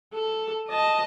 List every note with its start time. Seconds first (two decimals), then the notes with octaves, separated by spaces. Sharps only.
0.13 A4
0.69 D#5 A5